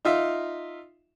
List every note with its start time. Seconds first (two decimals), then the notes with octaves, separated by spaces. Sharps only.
0.05 D#4 F4 E5